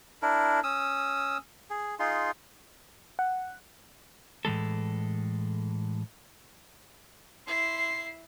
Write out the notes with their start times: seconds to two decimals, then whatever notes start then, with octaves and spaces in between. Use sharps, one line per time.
0.22 D4 E4 A#4
0.63 C#4 D#6 E6
1.70 G#4
1.99 D#4 F4 G#4 C6
3.19 F#5
4.45 A2 E3 G#3 A4
7.47 E4 C6 C7